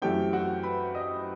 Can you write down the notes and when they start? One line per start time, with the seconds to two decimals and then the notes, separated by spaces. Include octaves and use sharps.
0.02 F#2 E3 A3 C4 G4 G5
0.33 F#4 F#5
0.63 B4 B5
0.94 D#5 D#6